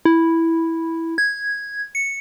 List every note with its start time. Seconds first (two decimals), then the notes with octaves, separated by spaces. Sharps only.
0.05 E4
1.18 G#6
1.95 C#7